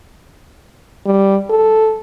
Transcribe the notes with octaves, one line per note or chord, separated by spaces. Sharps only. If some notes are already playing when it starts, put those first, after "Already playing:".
G3
A4